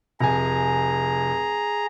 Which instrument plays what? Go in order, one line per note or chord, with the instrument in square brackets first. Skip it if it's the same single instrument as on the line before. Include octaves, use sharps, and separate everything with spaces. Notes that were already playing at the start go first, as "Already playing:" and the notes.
[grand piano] F1 G#5 [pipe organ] G#4 A#5